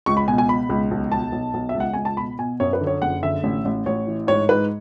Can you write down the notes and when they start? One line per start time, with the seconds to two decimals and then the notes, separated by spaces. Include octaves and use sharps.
0.06 C#2 C#6
0.17 B5
0.27 B2 G#5
0.38 G#5
0.49 B2 B5
0.69 C#2
0.91 B1
1.12 B1 A5
1.32 B1
1.54 B1
1.69 E5
1.74 C#2
1.80 F#5
1.94 C#2 G#5
2.05 A5
2.17 B2 B5
2.38 B2 G#5
2.60 F#2 C#5
2.73 B4
2.81 D3
2.87 C#5
3.02 F#1 F#5
3.23 D3 E5
3.43 A1
3.65 A1
3.86 A1 C#5
4.07 E3
4.27 G#2 C#5
4.49 G#2 B4